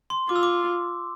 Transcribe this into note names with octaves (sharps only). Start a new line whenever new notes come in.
C6
F4 D6
E6
D6